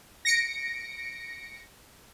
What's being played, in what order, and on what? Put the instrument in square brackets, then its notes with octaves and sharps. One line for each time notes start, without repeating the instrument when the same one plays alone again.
[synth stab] A#6 C#7 D7